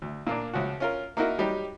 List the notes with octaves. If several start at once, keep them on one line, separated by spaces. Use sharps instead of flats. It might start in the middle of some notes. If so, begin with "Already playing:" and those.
D2
A#2 A#3 D4
C#2 F3 F#4
C#4 F4 A#4
A#3 D#4 E4 F#4 A#4
F#3 G3 D#4 G4